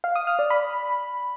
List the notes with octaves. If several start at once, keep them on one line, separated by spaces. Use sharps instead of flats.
F5
D#6
F6
D5
B5